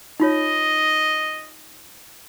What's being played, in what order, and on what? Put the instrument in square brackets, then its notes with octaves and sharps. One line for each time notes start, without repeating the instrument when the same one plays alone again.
[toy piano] D#4 F4 C#5 [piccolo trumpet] D#5